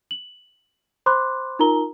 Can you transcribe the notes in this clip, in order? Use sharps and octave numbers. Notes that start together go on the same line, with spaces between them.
F#7
C5 B5 C6 D6 F#6
D#4 F4 A#4 A#5 G7